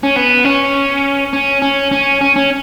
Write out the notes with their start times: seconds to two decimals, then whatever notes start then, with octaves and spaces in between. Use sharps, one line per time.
0.03 C#4
0.16 B3
0.45 C#4
1.33 C#4
1.62 C#4
1.92 C#4
2.21 C#4
2.36 C#4